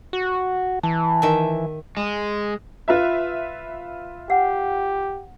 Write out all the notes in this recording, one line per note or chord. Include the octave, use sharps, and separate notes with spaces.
F#4
E3 A5
D#3 E5
G#3
F4 B4 E5
G4 F#5